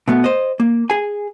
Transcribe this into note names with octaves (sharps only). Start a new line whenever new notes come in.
B2 A3 B3
C5 D#5
A#3
G#4 G#5